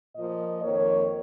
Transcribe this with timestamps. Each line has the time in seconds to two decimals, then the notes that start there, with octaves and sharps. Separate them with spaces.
0.16 A#2 F3 A#3 D#5
0.63 F2 D#3 A#3 C#5